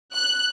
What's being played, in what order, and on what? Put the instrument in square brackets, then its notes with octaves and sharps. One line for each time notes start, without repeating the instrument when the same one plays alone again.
[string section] F#6